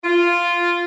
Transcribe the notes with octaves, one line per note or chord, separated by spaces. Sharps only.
F4